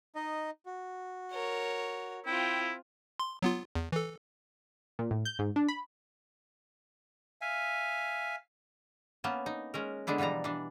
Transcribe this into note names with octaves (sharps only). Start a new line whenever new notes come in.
D#4 D#5
F#4
A#4 C#5
C4 E4 F4 G5
C6
F#3 B3 F4
E2
E3 A4
A#2
A2
G6
G#2
D4
B5
E5 F5 G#5
A#3 B3 C#4 A5
D#4
G#3 C#4 A#4
D3 G#3 B3 D4 E4
B2 E3 F3 G3 A#5
E3 D4